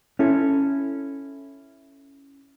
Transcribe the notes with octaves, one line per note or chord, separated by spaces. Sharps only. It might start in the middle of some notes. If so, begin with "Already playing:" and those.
C#4 E4 A4